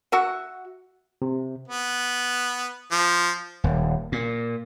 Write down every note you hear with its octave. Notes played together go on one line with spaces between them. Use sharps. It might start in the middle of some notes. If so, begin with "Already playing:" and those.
F#4 E5 F#5
C3
B3
F3
D#1
A#2